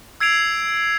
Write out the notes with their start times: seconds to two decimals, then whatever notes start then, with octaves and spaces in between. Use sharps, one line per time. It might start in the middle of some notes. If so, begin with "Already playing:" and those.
0.20 E6 G#6 C7 D7 F7